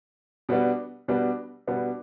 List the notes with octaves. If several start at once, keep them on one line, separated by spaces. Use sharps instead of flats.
B2 G3 B3 D4
B2 G3 B3 D4
B2 G3 B3 D4